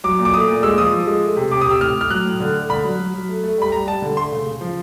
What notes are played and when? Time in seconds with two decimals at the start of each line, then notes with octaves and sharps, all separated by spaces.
0.04 F#3 D6
0.19 A#2
0.25 D6
0.34 A3 D#6
0.48 A#2
0.63 G#3 E6
0.78 F3 D#6
0.93 F3
1.07 G#3
1.22 A3
1.37 C3
1.52 C3 D6
1.61 D#6
1.66 C3
1.71 E6
1.81 A2 F6
1.95 A2
2.01 F6
2.10 F#3 F#6
2.25 A2
2.40 D3
2.55 A3
2.69 D3 B5
2.84 F#3
2.99 F#3
3.14 F#3
3.29 A3
3.44 A3
3.58 G3 B5
3.72 G3 A#5
3.88 G3 A5
4.02 D3
4.17 A3 C6
4.32 C#3
4.47 C#3
4.61 F3